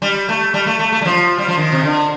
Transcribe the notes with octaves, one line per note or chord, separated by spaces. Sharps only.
G3
A3
G3
A3
A3
A3
G3
F3
G3
F3
D#3
C3
D3